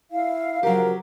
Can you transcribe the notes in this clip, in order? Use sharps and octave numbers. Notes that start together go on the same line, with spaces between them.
E4 F5
C#3 F3 F#3 F#4 G4 A#4